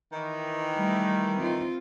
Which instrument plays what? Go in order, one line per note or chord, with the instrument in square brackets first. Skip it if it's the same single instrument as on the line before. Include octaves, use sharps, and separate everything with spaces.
[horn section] D#3 E3
[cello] G3 A3
C4 F4